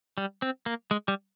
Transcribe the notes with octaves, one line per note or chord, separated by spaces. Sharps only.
G3
C4
A#3
G#3
G3